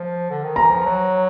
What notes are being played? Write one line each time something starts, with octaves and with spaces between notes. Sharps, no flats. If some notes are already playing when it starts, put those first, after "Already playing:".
Already playing: F3
D3
D#3
E3 A#5
F3
F#3